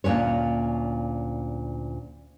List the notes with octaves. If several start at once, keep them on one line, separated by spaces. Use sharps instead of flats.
D2 A#2 E3 C#4 C#5